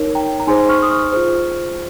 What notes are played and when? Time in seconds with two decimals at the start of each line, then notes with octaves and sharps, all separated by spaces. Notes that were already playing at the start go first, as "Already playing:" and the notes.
Already playing: D#4 A#4 C#5
0.15 G5 A#5
0.40 A#5
0.47 D#4 G#4 C5 G#5 C6
0.69 C#6 F6
0.82 D#6
0.90 C#6 F6
1.12 F4 G#4 C5